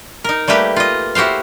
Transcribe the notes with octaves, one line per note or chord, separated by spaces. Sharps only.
D#4 A#4
G3 A3 A#3 G4 B4
F4 D#5
E4 F#4 G4 C5 F5